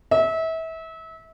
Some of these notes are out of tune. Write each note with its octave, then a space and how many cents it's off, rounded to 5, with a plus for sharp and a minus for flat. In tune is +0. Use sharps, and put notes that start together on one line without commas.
E5 -30